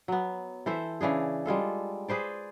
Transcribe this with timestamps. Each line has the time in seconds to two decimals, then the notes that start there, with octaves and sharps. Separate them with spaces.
0.08 F#3 B3
0.66 E3 A4 C5 E5
1.01 C#3 E3 D4 G#4
1.46 G3 G#3 F4 A4
2.09 G#4 B4 C5 D5